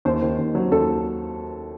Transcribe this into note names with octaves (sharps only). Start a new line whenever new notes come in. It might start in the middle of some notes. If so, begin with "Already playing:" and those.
D#2 C5
D#3
D#2
F#3
D#2 A4